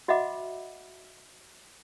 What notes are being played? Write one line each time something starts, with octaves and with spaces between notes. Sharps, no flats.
F#4 D#5 E5 F#5 B5 D6